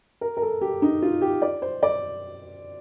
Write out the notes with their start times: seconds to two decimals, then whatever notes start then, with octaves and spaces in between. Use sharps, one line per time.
0.21 A#4
0.37 A#4
0.42 A4
0.61 G4
0.82 D#4
1.02 F4
1.22 G4
1.42 D5
1.62 C5
1.83 D5